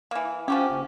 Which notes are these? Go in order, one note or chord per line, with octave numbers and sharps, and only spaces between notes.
E3 A#3
F3 C#4 F#4 G4
F#1